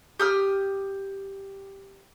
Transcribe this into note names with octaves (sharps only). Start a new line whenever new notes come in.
G4 D#6 F6